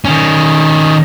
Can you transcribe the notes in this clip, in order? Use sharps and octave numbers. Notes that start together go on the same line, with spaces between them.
D#3 C#4